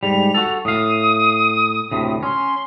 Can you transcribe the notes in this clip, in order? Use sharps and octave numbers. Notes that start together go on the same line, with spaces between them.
G#2 G3 F7
F#4 A4
A2 F5 D#6
D2 A2 C3
C#4 C6